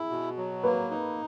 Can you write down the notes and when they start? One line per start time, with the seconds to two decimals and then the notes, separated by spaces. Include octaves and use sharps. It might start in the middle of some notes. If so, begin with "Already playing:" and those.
Already playing: E4 G#4
0.10 B2
0.37 F#3
0.64 A#3 B4
0.91 D#4